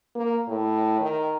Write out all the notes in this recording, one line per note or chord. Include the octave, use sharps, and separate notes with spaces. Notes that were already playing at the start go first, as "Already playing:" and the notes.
A#3
A2
D#3